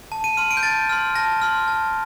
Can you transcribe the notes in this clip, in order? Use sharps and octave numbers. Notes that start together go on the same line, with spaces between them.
A5
D#7
C6 F6 D#7
D7
G6
A5 A6
C6 F6
A5 A#6
C6 F6
A5